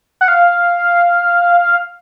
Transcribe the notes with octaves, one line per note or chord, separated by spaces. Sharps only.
F#5
F5